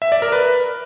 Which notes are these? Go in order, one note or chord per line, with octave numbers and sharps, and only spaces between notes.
E5
D5
A#4
B4